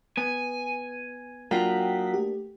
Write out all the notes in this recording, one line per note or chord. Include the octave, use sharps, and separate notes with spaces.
B3 G#5
F#3 A#3 D4 F4 A4 G5 D#6 B6
A3 G4